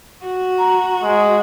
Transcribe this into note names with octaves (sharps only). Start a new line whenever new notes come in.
F#4
A#5
G#3